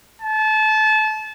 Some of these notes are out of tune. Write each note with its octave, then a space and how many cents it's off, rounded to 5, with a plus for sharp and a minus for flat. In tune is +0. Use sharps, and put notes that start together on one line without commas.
A5 -30